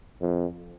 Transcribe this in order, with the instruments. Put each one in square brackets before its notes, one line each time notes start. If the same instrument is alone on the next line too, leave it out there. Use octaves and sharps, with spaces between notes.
[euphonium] F2